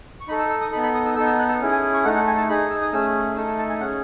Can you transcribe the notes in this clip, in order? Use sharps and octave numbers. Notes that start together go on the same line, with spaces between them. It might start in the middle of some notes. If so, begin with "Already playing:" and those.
C#6
D#4 A4 B5
E6
E6
D#6
B3 D#4 A4 B5
B5
D#6
E6
B3 D#4 A4 E6
E6
F#6
E6
C#4 E4 G#4
G#5
C#6
A3 D#4 A4 F#5
F#5
G#5
A5
D#4 G#4 B5
E6
D#6
A3 C#4 G#4 E6
A3 D#4 A4 E6
E6
A5
G#5
C#4 G#4 F#5